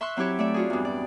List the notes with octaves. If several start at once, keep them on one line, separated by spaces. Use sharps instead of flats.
E5 C6 C#6 E6 F#6
F#3 C4 E4 G4 C#5
A3 D5 E5
F4 F#4 G#4
E2 G2
D5